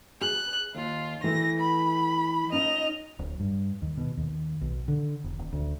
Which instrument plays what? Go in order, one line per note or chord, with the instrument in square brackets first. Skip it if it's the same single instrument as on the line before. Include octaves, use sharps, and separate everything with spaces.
[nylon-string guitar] G#4 [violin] F#6
[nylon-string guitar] D#2 [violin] F4
[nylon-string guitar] E3 A3 [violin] A#6
[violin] B5
[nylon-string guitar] C#4 D#4 F4 [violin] D#5 F7
[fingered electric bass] D1
G2
D#2
B2
D#2
B1
D3
E1
D#1
D2